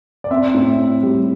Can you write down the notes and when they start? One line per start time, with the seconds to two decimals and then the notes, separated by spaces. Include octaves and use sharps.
0.24 D5
0.31 C4 E5
0.54 A2
0.79 C4
1.03 G3